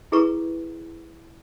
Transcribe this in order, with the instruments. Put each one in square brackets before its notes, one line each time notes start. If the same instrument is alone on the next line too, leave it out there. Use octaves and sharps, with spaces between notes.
[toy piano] E4 G#4 A4 B4 A#5 C#6